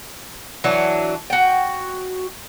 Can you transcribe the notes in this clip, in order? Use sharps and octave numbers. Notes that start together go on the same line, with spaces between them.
E3 F#3 D4
F#4 G5